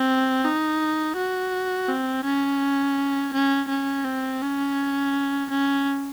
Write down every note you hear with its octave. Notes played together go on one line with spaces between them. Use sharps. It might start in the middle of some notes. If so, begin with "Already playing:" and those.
Already playing: C4
D#4
F#4
C4
C#4
C#4
C#4
C4
C#4
C#4